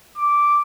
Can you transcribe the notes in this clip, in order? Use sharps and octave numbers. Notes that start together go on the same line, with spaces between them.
D6